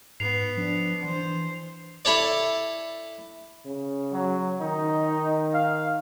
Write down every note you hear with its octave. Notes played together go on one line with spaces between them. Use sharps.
G#2 B3 C7 F7
F3 D4
E3 C5
E4 A4 C#5 D5
C#3
F#3
D#3 D#4
F5